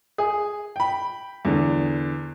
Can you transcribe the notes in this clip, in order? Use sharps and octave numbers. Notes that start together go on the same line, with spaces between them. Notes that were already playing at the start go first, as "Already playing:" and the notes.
G#4
G5 B5
E2 D3